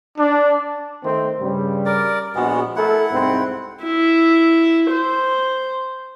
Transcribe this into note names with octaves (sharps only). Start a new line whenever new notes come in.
D4
D#3 A3 C4
G2 C#3 G3
A#4 D5
A#1 G#3 B3 F#4
A3 E4 A4 A#4 F#5
C2 G#2 C4
E4
C5